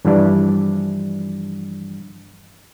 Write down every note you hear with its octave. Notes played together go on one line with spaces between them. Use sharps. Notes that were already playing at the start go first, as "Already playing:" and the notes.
G2 E3 F3 G3 D4